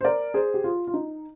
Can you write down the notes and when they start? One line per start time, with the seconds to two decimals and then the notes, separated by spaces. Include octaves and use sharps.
0.01 C5
0.05 A#4 D5
0.34 G#4 C5
0.54 G4
0.64 F4
0.87 F4
0.94 D#4